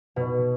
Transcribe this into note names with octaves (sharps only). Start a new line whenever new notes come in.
B2